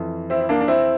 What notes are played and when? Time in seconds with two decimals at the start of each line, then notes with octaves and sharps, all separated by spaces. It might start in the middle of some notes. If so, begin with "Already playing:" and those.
Already playing: F2 E3
0.30 C4 E4
0.41 E4
0.49 A#3 D4
0.61 D4
0.68 C4 E4